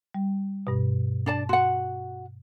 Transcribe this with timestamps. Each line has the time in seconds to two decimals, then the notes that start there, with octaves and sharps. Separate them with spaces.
0.14 G3
0.67 G2 B2
1.26 D4 D5 A5
1.49 F#4 F#5 C6